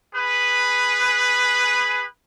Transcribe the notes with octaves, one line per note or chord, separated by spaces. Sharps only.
G#4 B4